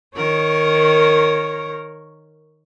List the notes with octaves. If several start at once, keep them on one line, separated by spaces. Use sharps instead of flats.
D#3 A#4 C#5